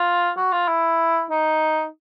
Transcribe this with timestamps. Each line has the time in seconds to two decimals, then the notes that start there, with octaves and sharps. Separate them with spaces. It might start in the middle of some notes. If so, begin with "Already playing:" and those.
Already playing: F4
0.37 F#4
0.52 F4
0.68 E4
1.30 D#4